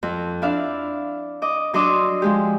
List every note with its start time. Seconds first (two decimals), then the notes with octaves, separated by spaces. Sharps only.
0.03 F2
0.42 D4 E4 D5 E5 F5
1.42 D#5 D6
1.73 F#3 D4 D#5 C6 D6 E6
2.22 F3 G#3 G4